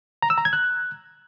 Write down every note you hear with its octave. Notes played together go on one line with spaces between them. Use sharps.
A#5
E6
A#5
G#6
F#6